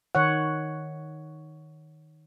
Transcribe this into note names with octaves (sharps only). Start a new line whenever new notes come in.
D#3 C#5 F#5